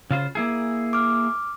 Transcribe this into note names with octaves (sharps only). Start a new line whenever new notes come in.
C#3 F4 C5
A#3 E4 G#4
D6 F6